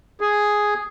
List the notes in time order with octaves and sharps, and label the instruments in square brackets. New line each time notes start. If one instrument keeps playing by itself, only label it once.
[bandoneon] G#4